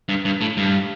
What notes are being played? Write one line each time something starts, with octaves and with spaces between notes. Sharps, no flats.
G2
G2
A2
G2